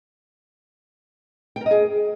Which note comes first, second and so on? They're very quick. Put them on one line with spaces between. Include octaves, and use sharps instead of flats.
G5 A#4 D#5 G#4